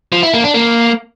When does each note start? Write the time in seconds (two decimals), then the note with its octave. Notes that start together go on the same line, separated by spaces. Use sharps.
0.12 F3
0.23 E4
0.33 A#3
0.44 D4
0.54 A#3